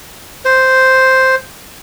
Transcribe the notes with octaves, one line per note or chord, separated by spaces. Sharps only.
C5